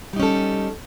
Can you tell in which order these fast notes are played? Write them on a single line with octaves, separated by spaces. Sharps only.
G3 D#4 C#4 A4